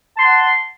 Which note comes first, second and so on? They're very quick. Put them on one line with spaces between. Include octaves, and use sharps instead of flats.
A5 C6 F#5